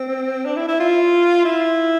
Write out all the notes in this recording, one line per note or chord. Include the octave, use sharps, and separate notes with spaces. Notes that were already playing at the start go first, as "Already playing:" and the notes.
Already playing: C4
D4
E4
E4
F4
E4